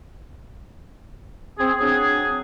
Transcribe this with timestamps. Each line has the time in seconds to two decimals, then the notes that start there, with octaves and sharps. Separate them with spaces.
1.59 C4 G#4
1.80 F#3 C4 D4 G#4